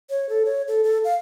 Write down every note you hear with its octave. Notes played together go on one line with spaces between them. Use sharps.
C#5
A4
C#5
A4
A4
F5